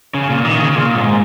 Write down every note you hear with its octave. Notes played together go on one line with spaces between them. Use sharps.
C#3
A#2
D#3
C#3
A#2
G#2